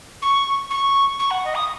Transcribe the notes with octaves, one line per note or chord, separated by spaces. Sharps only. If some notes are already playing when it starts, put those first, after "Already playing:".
C#6
C#6
C#6
F#5
D#5
D#6